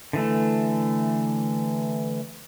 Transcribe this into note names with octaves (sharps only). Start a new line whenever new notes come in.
D3 E3 A3